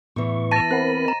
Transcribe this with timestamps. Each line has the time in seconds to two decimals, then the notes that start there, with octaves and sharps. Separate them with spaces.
0.16 E2 A2 E3 C#6
0.51 B4 A5 A6 A#6 D#7
0.71 C4 A#4 C5 F#5 B5
1.05 D#5 A#5